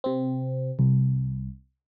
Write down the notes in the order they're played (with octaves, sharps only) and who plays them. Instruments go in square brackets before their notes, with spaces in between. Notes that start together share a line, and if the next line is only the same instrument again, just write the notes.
[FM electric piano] C3 C4
C2